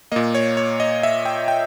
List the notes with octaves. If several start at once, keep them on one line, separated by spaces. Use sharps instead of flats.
A#2 A#3 D#5
C#5
C#5
D#5
E5
G5
G5